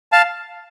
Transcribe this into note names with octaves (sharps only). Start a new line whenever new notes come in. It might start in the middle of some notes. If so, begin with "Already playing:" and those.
F5 A5